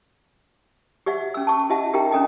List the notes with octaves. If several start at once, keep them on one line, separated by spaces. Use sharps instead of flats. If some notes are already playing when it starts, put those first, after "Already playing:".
G4 D5 E5 F#5
C#4 E6
A5 C#6
E4 G4 D#5 E5 F#5 A5
D#4 G4 A#4 E5 G5 A#5
C#4 D4 A4 D#5 G5